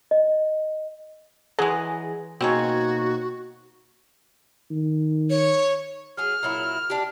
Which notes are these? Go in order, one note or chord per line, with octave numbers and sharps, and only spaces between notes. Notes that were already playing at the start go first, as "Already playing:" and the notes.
D#5
E3 F#3 G#3 G#4 G#5 A#6
B2 A#3 C4 C#4 D#4 F#4 C#5
D#3
C#5
F#3 G#4 F6
A#2 F#3 E4
D4 G4